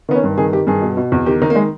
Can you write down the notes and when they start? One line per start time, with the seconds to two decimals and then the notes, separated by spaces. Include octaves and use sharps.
0.09 D#3 B3
0.15 C#4
0.24 G2
0.37 D#3 G#4
0.52 D#3 G4
0.67 G2 G#4
0.82 B2
0.97 B2
1.12 E2
1.26 D#3 G4
1.41 D#3 D#4
1.50 A#3
1.55 G#3